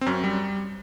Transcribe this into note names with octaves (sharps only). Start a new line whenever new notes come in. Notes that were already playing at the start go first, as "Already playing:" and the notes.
C4
F#2 C#4
G3